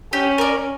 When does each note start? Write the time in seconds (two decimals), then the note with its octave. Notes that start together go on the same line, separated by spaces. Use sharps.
0.12 C#4 G4
0.38 A#4 D5